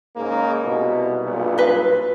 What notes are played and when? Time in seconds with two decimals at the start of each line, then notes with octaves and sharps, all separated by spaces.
0.17 G#2 C#3 A#3
0.64 C2 B2
1.23 B1 G2 A#2
1.58 F4 B4